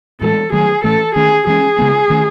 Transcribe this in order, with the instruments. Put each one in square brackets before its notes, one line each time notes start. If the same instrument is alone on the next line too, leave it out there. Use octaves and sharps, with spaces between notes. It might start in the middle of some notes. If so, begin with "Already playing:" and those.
[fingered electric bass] A2 E3 G#3 [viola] A4
[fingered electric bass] D#3 F#3 A3 [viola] G#4
[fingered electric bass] A2 E3 A3 [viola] A4
[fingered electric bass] D#3 A3 C#4 [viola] G#4
[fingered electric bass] E3 G#3 C#4 [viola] G#4
[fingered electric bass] C#3 G#3 B3
D#3 A3 C#4